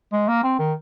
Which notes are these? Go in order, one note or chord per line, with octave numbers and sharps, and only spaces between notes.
G#3
A#3
C4
D#3